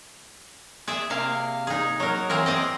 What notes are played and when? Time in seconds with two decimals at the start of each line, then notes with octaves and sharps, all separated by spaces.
0.88 G#4 D5 E5
1.10 C3 A#3 F5
1.67 D#4 G#4
2.00 F#3 A#4
2.30 E3 C4 G#4 A#4
2.46 C4 D5 D#5